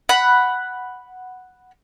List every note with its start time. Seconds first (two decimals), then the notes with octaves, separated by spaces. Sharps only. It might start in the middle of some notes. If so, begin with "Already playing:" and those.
0.09 F#5 B5